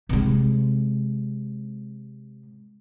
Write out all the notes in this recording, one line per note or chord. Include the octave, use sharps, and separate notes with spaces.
C3 G#3